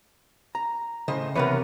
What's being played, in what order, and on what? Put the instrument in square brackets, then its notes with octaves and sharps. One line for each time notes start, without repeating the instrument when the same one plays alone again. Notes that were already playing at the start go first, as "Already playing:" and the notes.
[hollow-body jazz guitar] A#5
[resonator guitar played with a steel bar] A2 C5 D#5 [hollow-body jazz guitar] C#3
[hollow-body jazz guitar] C3 B4 C#5 [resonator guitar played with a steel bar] E3 B3 A#4